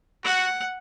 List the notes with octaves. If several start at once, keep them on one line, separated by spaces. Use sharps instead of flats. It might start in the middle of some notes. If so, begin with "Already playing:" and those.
F#4 F#5